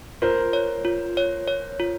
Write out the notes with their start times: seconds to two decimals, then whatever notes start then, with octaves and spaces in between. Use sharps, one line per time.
0.22 F4 A#4 C5
0.53 C#5
0.85 F4
1.17 C#5
1.48 C#5
1.80 F4